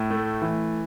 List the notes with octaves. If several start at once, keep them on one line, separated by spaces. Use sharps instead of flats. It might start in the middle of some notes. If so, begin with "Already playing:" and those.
Already playing: A2
A3
E3